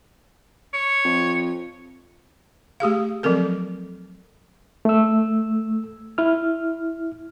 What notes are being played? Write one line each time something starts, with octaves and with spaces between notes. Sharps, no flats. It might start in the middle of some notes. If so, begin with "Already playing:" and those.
C#5
F2
A3 G4 G#4 F5
F3 F#3 C4 A4 A#4
A3 E6
E4 F6